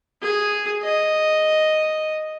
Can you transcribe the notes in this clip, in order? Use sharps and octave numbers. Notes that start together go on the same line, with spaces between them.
G#4
D#5